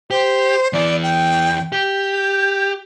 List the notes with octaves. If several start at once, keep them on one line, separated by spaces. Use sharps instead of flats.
G4 C5
E2 E4 D5
G5
G4 G6